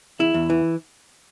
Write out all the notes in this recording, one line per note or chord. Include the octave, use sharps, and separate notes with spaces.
E2 E4
E2
E3